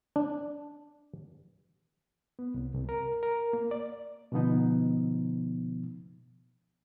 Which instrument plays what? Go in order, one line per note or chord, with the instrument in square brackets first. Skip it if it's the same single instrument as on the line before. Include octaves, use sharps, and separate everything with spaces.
[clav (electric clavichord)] D4
[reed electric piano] B3
C2
C2
A#4
A#4
A#3
D5
B2 D3 F3 B3 D#4